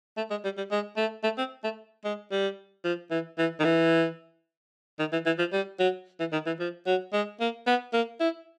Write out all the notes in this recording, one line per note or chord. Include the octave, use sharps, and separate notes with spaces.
A3
G#3
G3
G3
G#3
A3
A3
C4
A3
G#3
G3
F3
E3
E3
D#3
E3
D#3
E3
E3
F3
G3
F#3
E3
D#3
E3
F3
F#3
G#3
A#3
B3
A#3
E4